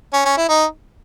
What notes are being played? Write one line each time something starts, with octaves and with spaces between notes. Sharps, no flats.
C#4
C#4
E4
D#4